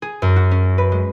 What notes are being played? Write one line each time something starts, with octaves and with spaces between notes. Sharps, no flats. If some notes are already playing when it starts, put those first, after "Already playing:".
G#4
F#2
F#4
C#4
B4
G#3